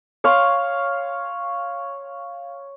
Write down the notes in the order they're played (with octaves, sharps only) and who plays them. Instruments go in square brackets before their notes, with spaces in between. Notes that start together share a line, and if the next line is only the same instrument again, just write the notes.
[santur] C#5 F5 C6